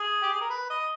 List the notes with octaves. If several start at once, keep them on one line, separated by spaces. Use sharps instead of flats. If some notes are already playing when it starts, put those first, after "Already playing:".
Already playing: G#4
G4
G#4
A#4
B4
D#5